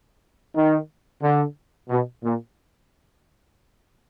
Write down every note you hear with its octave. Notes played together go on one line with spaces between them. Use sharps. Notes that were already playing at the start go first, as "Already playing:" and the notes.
D#3
D3
B2
A#2